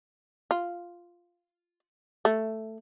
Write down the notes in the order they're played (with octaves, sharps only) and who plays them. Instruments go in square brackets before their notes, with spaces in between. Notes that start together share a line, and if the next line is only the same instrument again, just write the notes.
[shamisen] F4
A3